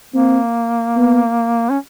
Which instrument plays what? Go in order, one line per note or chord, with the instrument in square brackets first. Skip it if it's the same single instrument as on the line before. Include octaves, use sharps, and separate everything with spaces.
[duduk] A#3 [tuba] C4
[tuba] B3
[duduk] C#4